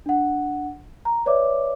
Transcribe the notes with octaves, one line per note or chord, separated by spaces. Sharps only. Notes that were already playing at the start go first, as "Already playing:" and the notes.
D4 F#5
A#5
B4 C#5 D5 E5 D6